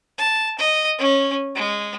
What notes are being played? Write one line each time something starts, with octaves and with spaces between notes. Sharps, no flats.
A5
D#5
C#4
G#3